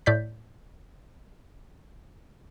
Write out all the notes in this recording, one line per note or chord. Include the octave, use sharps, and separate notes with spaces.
A2 D5 G6 B6